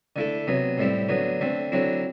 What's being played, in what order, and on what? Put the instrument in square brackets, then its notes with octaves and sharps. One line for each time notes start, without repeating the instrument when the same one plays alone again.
[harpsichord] D3 A3 E4 A4
C3 F#3 B3
A2 G3 C4 E4
D3 F#3 B3
D3 A3 C4
D3 F#3 C4 E4